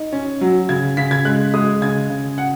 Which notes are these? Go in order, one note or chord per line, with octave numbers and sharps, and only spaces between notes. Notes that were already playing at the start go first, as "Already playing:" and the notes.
Already playing: D#4
C#4
F#3
C#3 G#6
C#3 B6
G#6
G#3 F#6
G#3 D#6
C#3 G#6
C#3
F#5